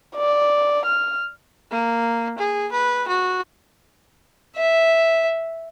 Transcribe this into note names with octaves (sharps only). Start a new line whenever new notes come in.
D5
F6
A#3
G#4
B4
F#4
E5